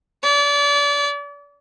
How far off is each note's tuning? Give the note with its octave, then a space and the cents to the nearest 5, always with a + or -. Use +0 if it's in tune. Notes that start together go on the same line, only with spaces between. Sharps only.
D5 -35